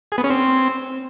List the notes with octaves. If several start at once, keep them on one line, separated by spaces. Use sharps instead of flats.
G#4
B3
C#4
C4